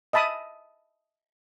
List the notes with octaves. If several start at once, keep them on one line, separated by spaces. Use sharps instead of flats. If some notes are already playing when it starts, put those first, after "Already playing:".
D#5 E5 A5 B5 D#6